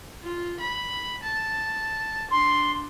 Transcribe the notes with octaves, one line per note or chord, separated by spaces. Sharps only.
F4
B5
A5
D4 C6